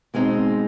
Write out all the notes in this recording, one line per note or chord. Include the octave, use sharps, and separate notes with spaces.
B2 G#3 C4 D#4